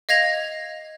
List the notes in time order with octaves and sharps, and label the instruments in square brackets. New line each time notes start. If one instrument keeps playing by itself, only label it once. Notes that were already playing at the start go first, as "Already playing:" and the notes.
[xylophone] D#5 F5 G#6 A#6 F7